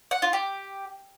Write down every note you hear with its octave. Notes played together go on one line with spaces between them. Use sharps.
F#5
F4
G4